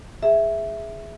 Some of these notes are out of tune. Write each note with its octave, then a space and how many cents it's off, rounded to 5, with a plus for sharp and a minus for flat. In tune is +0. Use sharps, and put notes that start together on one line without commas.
G#4 +0 E5 +0